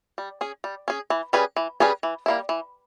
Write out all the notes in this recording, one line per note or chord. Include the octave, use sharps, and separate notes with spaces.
G3
C#4 G#4
G3
C#4 G#4
E3
G3 C#4 G#4 B4
E3
G3 C#4 G#4 B4
E3
G3 A#3 E4
E3